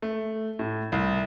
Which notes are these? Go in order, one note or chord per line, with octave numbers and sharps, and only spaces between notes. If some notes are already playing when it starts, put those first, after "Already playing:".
A3
A2
C2